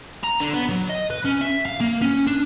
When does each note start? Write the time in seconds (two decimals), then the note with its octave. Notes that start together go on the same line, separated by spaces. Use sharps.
0.23 A#5
0.40 D3
0.53 B3
0.69 F#3
0.89 D#5
1.10 B4
1.25 C#4
1.41 E5
1.65 F5
1.80 A#3
2.02 C#4
2.27 D4